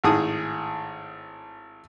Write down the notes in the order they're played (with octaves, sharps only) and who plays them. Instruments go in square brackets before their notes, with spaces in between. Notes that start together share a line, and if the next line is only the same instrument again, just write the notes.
[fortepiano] G#1 A2 G#4 D#6